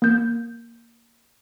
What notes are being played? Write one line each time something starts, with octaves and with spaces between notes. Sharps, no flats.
A#3 G6